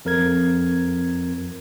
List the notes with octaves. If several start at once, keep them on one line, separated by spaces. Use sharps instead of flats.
F2 A#4 G#6